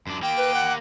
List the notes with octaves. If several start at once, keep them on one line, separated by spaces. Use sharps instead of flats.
F#2 D4
A#3 G4 G5
B4
F#5